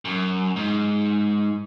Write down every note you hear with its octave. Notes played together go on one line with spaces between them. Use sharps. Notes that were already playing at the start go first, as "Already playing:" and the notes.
F#2
G#2